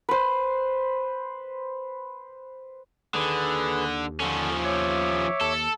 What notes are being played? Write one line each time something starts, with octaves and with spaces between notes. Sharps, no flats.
B4 C5
D#2 D3 G#4 B4
D3 F3 C#4
C#5 E5 D6
D#2 A4